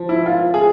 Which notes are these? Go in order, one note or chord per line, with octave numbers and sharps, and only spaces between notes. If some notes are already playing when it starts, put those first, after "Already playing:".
Already playing: F3
E4
F4
G#4